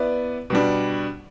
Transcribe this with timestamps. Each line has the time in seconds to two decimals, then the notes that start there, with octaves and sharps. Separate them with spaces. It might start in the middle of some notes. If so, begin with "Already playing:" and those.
Already playing: B3 E4 B4 D5
0.50 B2 G3 D4